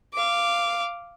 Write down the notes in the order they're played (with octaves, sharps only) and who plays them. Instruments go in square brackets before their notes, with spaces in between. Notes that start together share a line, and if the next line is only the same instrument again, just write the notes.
[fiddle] F5 D6